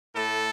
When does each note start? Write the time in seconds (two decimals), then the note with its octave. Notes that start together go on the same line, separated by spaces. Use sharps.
0.13 A2 A3 A4